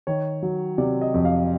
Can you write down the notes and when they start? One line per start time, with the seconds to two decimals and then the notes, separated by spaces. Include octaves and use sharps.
0.07 D#3 C#5
0.43 F#3
0.78 C3 D5
1.02 D#5
1.14 F2
1.25 F5